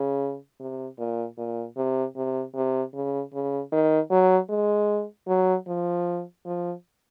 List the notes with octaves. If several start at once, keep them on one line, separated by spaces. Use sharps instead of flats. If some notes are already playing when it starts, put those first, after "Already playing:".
Already playing: C#3
C3
A#2
A#2
C3
C3
C3
C#3
C#3
D#3
F#3
G#3
F#3
F3
F3